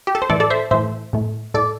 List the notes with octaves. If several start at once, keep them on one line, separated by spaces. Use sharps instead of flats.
G4
A4
C5
A2 E3 A3 A4 D5
A4 D5
C5 E5
A2 E3 A3 C5 E5
A2 A3
A2 A3 A4 D5